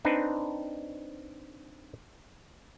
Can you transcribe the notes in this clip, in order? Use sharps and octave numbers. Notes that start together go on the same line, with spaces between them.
C4 D4 D#4 B4 C5